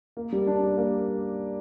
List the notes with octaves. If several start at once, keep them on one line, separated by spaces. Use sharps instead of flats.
A#3
G3
D4
G3
A#3